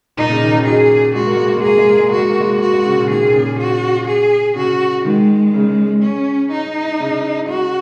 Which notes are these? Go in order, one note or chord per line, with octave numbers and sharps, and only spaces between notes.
A#2 D#4
C#3
D#3
C#3
F#3 G#4
G#3 F#4
A#3
G#3
A#3
G#3
A#3 G#4
G#3
A#3
G#3
A#3 F#4
G#3
A#3
G#3
F#4
G#3
C#3
A#2
D#3 G#4
C#3
A#2
C#3
F#4
G#4
C#3 F#4
D#3 G#3
C#3
C#4
D#4
C#3
F#4